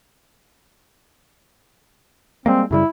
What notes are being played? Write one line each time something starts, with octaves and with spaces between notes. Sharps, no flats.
G3 G#3 A#3 C4
F#2 C#3 G3 E4